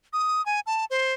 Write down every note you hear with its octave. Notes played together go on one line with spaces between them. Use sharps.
D#6
G#5
A5
C5